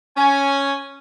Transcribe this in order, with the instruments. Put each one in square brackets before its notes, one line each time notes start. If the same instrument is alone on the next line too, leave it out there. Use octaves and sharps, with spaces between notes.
[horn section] C#4 G#5